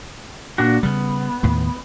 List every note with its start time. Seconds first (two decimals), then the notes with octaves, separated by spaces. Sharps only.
0.58 A#2 D4 F#4
0.83 C#3 G3 B3
1.43 D#2 A2 D#3